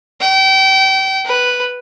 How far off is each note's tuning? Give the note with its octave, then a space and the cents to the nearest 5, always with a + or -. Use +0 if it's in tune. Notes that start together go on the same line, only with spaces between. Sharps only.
G5 -30
B4 +0